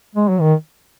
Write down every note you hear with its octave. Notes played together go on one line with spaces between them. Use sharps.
G#3
F#3
D#3